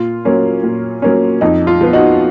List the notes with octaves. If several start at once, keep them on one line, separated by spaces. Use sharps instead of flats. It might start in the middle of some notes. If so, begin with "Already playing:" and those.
Already playing: A#2 F4
F#3 A#3 C#4
A#2
F#3 A#3 C#4
F2 D#4
F4
F3 B3
D#4 F#4